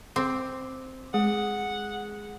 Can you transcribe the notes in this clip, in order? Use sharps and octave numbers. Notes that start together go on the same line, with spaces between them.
C4 D6
G#3 G#4 F#5